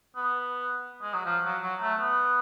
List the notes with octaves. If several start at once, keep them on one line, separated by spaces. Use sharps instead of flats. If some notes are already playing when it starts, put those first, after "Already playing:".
B3
G#3
F#3
F3
F#3
F#3
A3
B3